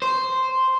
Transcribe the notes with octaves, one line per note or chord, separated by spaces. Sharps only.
C5